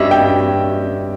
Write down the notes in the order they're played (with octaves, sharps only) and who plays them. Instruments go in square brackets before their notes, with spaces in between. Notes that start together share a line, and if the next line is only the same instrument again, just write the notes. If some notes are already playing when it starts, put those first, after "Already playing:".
Already playing: [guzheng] G2 G3 C#4 [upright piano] D#5 E5
[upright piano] G5